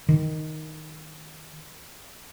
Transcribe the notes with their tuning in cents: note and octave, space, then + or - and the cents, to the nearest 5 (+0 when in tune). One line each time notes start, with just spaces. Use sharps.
D#3 +0